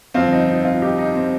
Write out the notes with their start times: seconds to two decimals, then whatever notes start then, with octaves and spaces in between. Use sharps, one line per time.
0.14 G1 F2 F3 C4 F4
0.32 D#4
0.49 D#4
0.65 C4 F4
0.82 D#4 G4
0.98 D#4
1.15 C4